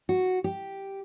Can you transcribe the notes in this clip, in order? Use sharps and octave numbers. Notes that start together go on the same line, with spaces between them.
F#4
G4